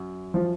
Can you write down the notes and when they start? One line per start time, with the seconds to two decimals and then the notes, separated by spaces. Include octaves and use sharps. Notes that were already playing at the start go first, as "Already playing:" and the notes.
Already playing: F#2
0.34 F3